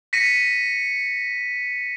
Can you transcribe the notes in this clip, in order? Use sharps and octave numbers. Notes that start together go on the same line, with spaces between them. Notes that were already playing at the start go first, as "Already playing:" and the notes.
A#6 B6 C#7 D#7